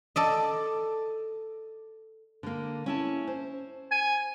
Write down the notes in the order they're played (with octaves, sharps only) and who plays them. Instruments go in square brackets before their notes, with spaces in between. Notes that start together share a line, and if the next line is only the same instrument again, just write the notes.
[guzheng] A4 D5 D#5
[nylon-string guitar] D3 A#3
C#4 E4 A5
C5
[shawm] G#5